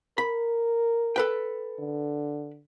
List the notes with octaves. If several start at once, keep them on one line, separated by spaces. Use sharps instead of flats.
A#4 B5
A4 B4 G5
D3